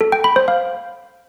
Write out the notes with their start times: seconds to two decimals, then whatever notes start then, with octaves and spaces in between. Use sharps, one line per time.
0.01 A4
0.12 G5
0.24 B5
0.36 C5
0.48 F5